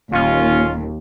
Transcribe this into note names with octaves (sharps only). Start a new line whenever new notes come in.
D#1 D#2 C#4 F4